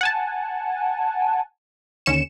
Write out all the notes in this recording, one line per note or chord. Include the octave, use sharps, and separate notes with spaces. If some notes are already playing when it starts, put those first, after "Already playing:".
F#5 G#5 A5
D#2 D3 C#4 C#7 E7